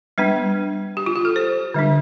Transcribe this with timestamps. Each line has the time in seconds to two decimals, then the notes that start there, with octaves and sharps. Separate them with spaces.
0.18 G3 B3 D4 B4
0.97 G4
1.06 F4
1.15 G4
1.25 A4
1.36 C5
1.74 D3 G3 D4